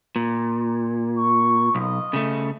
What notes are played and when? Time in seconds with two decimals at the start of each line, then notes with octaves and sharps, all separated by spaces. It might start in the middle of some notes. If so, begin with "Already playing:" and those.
0.16 A#2
1.19 C#6
1.75 B1 F4 D#5
2.13 C#3 A3